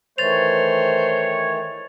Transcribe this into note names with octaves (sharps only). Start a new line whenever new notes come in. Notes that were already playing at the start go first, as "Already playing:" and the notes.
D#3 E3 A3 C5 C#5 A6 F7